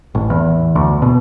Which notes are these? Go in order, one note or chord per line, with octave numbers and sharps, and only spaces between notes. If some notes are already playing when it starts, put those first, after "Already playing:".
A1
E2
D2
B2